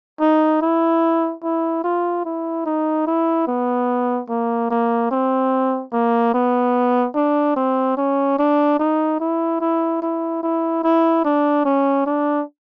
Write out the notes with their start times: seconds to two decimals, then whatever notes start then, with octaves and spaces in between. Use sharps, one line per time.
0.21 D#4
0.62 E4
1.43 E4
1.84 F4
2.25 E4
2.66 D#4
3.07 E4
3.48 B3
4.29 A#3
4.70 A#3
5.11 C4
5.93 A#3
6.34 B3
7.15 D4
7.56 C4
7.97 C#4
8.39 D4
8.79 D#4
9.20 E4
9.61 E4
10.02 E4
10.43 E4
10.84 E4
11.25 D4
11.65 C#4
12.06 D4